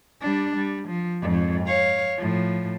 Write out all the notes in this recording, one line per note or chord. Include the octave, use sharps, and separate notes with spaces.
G3 D4
G3
F3
F2 G#2
C#5 F5
A2 F3